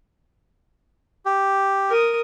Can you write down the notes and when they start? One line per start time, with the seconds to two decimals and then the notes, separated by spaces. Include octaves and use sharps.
1.25 G4
1.90 A#4 D#6